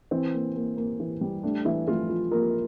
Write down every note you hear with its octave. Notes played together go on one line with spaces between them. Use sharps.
E3 C4
A#3
A#3
A#3
E3
G3
A3 D4
E3 A3 E4
F3 A3 F4
F3
F3 A#3 A#4